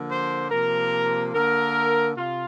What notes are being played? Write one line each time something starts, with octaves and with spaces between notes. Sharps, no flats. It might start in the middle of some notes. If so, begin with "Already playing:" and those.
Already playing: D3 F3 A#3
C5
C3 F3 A#3 A#4
D3 A#3 A#4
C3 F4